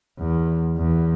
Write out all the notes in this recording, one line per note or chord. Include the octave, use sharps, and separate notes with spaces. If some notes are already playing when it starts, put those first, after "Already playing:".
E2
E2